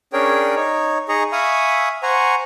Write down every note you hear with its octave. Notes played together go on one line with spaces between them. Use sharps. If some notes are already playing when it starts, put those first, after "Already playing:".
C#4 D4 G#4 A#4 C#5 G5
D#4 C#5
D#4 G#4 D#5 A#5 C#6
E5 F5 G#5 B5 C#6 D#6
C5 F#5 G#5 A#5 C#6